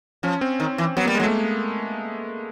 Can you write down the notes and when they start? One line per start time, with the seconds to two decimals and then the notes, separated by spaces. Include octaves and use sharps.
0.23 F3 C#4
0.41 C4
0.60 D#3
0.78 E3
0.97 F#3 B3
1.06 G3 A#3
1.15 G#3
1.20 F#3
1.24 A3